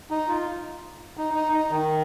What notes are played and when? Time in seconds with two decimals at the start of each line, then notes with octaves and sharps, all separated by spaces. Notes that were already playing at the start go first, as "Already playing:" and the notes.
0.10 D#4
0.28 F4
1.17 D#4
1.34 D#4
1.53 D#4
1.71 D#3